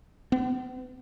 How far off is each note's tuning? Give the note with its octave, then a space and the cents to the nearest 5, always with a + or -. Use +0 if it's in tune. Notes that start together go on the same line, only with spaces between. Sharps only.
B3 +40